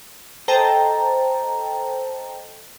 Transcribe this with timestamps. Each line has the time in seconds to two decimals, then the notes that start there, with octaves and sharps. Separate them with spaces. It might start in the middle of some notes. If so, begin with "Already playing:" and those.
0.48 A4 C5 D#5 G5 A5 A#5